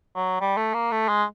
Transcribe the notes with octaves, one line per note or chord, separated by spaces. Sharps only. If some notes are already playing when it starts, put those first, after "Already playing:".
F#3
G3
A3
A#3
A3
G#3